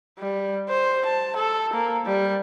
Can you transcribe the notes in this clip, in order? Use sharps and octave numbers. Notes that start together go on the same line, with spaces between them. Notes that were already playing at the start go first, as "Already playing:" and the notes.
G3
C5
A5
A4
A#3
G3